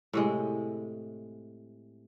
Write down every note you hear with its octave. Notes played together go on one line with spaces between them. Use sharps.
A2 C3 G#3